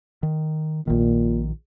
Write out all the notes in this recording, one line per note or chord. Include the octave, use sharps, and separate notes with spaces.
D#3
A#1 A#2 D#3